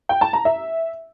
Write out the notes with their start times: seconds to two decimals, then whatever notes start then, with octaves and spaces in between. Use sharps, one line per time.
0.09 G5
0.21 A5
0.33 A#5
0.45 E5